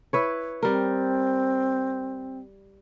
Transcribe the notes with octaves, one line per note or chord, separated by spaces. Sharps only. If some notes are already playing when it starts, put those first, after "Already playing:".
E4 B4 C#5
G3 C4 A#4